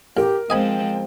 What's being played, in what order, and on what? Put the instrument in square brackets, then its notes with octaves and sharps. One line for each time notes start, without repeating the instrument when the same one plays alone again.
[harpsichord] A1 [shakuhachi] G4 [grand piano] A#4
[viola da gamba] F3 G#3 C4 [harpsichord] D#5 G#5 B5 [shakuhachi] G5